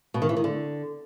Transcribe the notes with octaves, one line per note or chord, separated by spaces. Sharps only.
B2
D#3
E3
D#3
D3